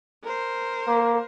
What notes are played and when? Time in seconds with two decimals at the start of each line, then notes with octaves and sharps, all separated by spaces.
0.24 A#4 C5
0.87 A#3